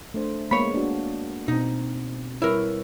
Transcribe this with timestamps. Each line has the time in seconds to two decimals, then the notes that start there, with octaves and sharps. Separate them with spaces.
0.14 A3 D4 C5
0.51 G#3 A#3 B3 C#5 B5
0.74 D4 F#4
1.48 B2 C4 D#4
2.42 G3 E4 A#4 B4 C#5